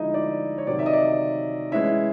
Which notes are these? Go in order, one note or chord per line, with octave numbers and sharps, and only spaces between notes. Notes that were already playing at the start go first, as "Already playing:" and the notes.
Already playing: D3 F3 G#3 D#4 E4 D#5 E5
D5
C#5
C3 D#3 F#3 D5
E5
D#5
D5
E3 G#3 C#4 E4 E5